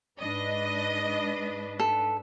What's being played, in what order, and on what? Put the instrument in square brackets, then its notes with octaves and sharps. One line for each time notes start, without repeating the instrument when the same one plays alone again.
[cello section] G#2 D4 B4 [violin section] D#5
[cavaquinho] A4